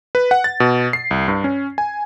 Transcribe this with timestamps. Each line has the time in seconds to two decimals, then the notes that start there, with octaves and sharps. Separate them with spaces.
0.15 B4
0.31 F#5
0.44 A6
0.60 B2
0.93 C7
1.11 C2
1.28 G2
1.44 C#4
1.78 G#5